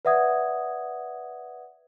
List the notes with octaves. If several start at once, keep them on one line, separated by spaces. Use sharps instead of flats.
B4 D5 E5 F#5 D#6 G#6